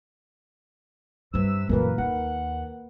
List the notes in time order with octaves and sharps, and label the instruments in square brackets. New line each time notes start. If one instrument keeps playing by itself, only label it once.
[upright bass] G2 G3 [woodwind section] C3 B4 E6
[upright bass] F#2 A#2 [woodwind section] E3 [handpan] A#3 A#4 B4
[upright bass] D#2 [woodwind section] F#5